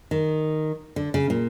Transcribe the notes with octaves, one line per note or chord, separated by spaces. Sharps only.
D#3
D3
C#3
A#2